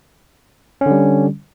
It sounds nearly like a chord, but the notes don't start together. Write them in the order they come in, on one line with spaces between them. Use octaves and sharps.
C#4 D3 G3